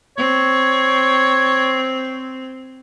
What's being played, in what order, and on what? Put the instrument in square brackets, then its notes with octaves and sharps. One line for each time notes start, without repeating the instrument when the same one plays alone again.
[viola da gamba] C4 [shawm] C#5